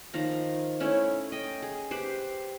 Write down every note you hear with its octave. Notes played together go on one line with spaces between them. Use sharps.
D#3 F3 A#5
A3 C#4 E4
D#5 G5
G#4
G4 B4 C5